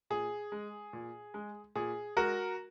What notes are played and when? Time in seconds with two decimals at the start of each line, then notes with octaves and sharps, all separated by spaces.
0.10 A#2 G#4
0.52 G#3
0.93 A#2
1.34 G#3
1.75 A#2 G#4
2.17 G#3 F#4 A#4